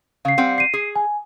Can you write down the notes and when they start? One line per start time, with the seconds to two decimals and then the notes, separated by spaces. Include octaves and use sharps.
0.25 C#3 F5 C7
0.38 G3 C4 F#5
0.58 C7 D#7
0.74 G#4
0.96 G#5